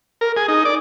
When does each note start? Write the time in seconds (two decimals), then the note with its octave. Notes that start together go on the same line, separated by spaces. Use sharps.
0.21 A#4
0.37 G#4
0.48 D#4
0.65 D5